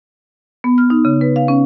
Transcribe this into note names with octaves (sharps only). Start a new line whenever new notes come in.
B3
F6
D#4
C#3
B4
F5
C#4